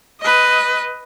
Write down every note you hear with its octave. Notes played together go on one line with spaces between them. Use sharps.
B4 D#5